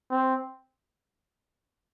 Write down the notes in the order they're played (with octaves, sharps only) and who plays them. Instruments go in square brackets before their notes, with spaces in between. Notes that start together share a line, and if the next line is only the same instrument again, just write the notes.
[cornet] C4